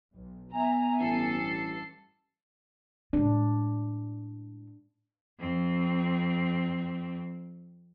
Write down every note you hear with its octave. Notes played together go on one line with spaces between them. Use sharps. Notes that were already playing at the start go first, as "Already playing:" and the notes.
B1
B3 E5 G#5 A#5
A1 G2 A4 C7
A2 G#3 D4
F2 C4